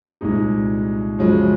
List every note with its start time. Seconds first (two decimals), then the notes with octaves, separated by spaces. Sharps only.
0.21 C2 A#2 G#3 D#4
1.19 F#2 C#3 F3 G#3